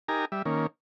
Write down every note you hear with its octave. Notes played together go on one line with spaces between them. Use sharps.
D#4 G4 A#4 G#5 A#5
G3 E5
D#3 A#3 C#4